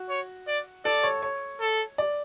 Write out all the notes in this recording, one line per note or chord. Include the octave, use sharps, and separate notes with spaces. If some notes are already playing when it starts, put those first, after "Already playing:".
Already playing: F#4
C#5
D5
A4 D5
C#5
C#5
A4
D5